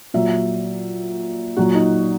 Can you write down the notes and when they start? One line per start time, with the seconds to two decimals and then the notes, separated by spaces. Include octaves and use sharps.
0.14 A#2 F#3 E5
1.57 A#2 F#3 F#4
1.75 D#4